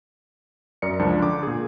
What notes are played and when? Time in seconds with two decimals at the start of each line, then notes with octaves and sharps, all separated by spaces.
0.82 F#2 A#4 D5 C#7
0.99 C#2 F3 D4
1.22 D3 D6
1.43 A#2 G#4